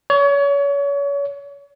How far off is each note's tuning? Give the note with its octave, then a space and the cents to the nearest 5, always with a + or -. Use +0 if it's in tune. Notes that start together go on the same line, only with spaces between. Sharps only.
C#5 +35